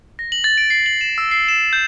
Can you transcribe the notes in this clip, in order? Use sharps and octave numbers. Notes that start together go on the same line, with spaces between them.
A#6
F#7
A6
D7
C7
F#7
E7
E6
C7
E7
G6